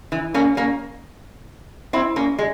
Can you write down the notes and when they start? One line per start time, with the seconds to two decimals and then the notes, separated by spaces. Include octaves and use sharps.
0.12 E3
0.34 A#3 C#4
0.57 A#3 C#4
1.93 C4 E4
2.16 A#3 C#4
2.39 G#3